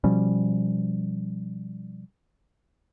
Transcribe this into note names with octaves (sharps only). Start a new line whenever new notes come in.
B2 F3 G3 C#4